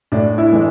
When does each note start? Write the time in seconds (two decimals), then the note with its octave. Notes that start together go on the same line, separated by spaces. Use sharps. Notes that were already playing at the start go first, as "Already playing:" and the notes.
0.12 A2 D4
0.38 E4
0.52 E3 G#3